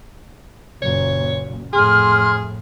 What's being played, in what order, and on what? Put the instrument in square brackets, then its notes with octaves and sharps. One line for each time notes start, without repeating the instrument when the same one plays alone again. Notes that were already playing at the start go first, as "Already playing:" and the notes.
[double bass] F#1 A#2 [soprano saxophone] C#5
[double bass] F2 A2 [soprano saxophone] G#4 [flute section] C6 F6